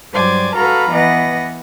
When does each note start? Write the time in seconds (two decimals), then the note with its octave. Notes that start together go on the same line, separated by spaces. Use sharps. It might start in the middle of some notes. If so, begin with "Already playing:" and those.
0.13 G2 F#3 C5 D5 G#5 D6
0.56 F#4 A4 B4 F5 A#5 B5
0.91 E3 B3 D#5 F#5 A#6